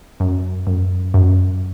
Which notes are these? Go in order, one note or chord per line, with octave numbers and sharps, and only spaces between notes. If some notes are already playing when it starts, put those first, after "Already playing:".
F#2
F#2
F#2